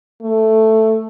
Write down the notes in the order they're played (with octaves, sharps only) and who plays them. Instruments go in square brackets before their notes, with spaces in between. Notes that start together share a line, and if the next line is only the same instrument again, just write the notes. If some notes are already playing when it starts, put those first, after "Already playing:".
[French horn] A3